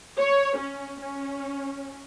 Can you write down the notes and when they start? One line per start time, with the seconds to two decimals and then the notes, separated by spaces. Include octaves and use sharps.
0.19 C#5
0.58 C#4
1.01 C#4